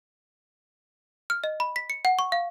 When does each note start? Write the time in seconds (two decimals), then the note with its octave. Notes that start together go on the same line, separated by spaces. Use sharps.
1.30 F6
1.44 D#5
1.60 B5
1.76 B6
1.90 C#7
2.05 F#5
2.19 C#6
2.32 F5